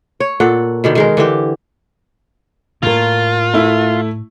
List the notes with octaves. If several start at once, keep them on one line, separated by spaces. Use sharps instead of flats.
C#5
A#2 A4 F#5
B2 D3 D#3
D#3 G#3 A#4
D3 E3 G4
A2 A#3 F4 A#4
A3 E4